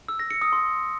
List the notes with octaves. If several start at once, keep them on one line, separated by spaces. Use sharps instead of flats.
E6
A#6
C#7
D#6
C6